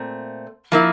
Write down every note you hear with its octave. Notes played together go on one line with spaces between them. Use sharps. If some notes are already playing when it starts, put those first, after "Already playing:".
Already playing: A#2 A3 C4
F3 A#3 E4